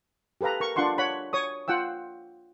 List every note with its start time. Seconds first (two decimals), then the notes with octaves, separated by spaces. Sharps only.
0.41 G4 A4 B4 F5 A#5
0.60 A#4 C#6
0.76 D4 F4 F#5 C6 C#6
0.98 C#5 F#5 B5
1.33 C#5 C#6 D#6
1.68 F4 F#5 G5 E6